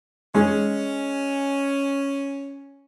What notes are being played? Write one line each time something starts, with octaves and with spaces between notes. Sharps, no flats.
G#3 C#4